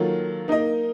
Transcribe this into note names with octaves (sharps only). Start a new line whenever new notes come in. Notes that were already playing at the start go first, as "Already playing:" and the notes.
Already playing: D#3 F#3 A#3 F4 A4
A#3 D#4 A#4 D#5